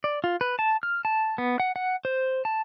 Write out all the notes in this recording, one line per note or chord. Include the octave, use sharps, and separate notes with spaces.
D5
F4
B4
A5
F6
A5
B3
F#5
F#5
C5
A5